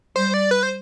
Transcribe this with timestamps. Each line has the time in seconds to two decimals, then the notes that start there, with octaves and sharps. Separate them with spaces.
0.16 G3 C5
0.34 D5
0.51 B4
0.63 C5